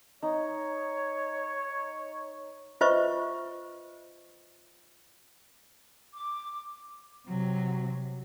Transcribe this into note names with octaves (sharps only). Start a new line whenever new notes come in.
D#4 C#5
F4 B4 C5 D#5 E5 C#6
D6
C3 F#3